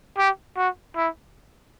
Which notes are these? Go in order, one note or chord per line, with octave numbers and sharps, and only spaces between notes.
G4
F#4
E4